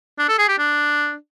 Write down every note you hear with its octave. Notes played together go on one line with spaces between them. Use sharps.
D4
A4
G#4
G4
D4